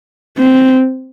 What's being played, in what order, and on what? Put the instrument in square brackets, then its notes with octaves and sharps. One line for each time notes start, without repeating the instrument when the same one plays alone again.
[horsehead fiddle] C4